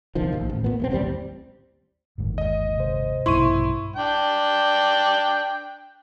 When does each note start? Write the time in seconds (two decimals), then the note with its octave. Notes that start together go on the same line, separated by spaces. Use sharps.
0.15 G1 C2 D#3 F3
0.33 A#1 D#2
0.50 A1
0.64 A#2 B3
0.80 E1 A3 C4
0.91 A1 D#2 G3 C4
2.18 G1 D#2 G#2
2.38 D#5
2.77 C3 C5
3.26 A#1 G2 B2 E4 C6 C#6 D#7
3.96 D4 G5